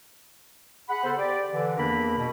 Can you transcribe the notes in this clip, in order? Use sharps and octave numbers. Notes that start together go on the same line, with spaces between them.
G#4 F#5 B5
C#3 B3 A4 C5
G4 D5
D3 E3
E2 D#3 A#3 D4 A#4 B5
B2